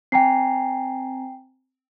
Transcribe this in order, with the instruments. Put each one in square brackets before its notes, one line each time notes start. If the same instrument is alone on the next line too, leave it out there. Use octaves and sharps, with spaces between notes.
[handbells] C4 G#5 A#5 [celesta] G5 C7